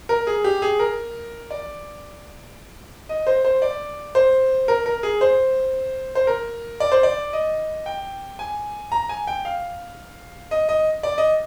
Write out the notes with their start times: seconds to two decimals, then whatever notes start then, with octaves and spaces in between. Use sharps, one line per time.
0.09 A#4
0.27 G#4
0.44 G4
0.62 G#4
0.79 A#4
1.51 D5
3.09 D#5
3.27 C5
3.45 C5
3.62 D5
4.15 C5
4.68 A#4
4.86 A#4
5.03 G#4
5.21 C5
6.15 C5
6.27 A#4
6.80 D5
6.92 C5
7.03 D5
7.33 D#5
7.86 G5
8.39 G#5
8.92 A#5
9.09 G#5
9.27 G5
9.45 F5
10.51 D#5
10.69 D#5
11.03 D5
11.18 D#5